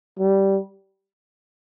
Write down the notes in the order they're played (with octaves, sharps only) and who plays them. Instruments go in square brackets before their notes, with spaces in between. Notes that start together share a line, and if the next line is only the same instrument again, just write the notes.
[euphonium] G3